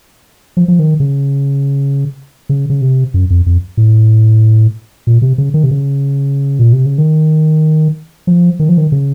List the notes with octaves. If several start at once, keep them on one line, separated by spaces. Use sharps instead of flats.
F3
F3
D#3
C#3
C#3
C#3
C3
F#2
F2
F2
A2
A#2
C3
C#3
D#3
C3
C#3
A#2
C3
C#3
D#3
F3
D#3
F3
D#3
C#3